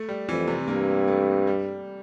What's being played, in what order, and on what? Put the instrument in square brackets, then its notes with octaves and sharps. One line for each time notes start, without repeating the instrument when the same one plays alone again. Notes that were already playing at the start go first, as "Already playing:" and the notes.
Already playing: [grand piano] A3
G3
[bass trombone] F2 [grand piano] E3
[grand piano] C3
[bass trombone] G2 [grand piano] A#3
[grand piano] A3
G3